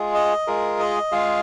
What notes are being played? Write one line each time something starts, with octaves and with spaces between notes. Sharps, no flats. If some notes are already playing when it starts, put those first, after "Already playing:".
Already playing: G#3 F4 G#4
D#5
G#3 F4 G#4 A#4
D#5
G#3 F4 G#4 F5